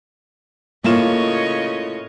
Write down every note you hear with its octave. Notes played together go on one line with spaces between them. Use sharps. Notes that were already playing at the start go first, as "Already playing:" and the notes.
A2 C#3 A#3 F4 C#5 D#5 E7